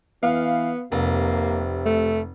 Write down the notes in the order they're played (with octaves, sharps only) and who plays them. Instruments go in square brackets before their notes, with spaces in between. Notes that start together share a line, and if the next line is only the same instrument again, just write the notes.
[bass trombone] E3 [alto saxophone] B3 [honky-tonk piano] F5
[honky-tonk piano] F1 [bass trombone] C3 [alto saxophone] A#3
[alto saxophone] A3